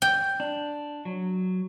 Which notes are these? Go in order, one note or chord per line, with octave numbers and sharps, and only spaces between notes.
G5
D4
F#3